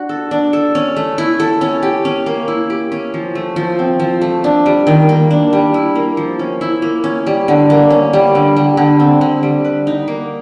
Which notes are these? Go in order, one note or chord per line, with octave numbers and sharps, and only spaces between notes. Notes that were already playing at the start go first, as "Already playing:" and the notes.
Already playing: D4 F#4
A4
D4
A4
C#4
A3
E4
A4
C#4
G4
C#4
A#3
E4
G4
C#4
F3
A3
F3
C4
F3
A3
D4
G3
D#3
A#3
D4
G3
E4
A#3
F3
C#4
E4
A#3
C#4
G3
D3
A#3
C#4
G3
D3
G3
D3
C4
D3
G3
B4
D#4
A#3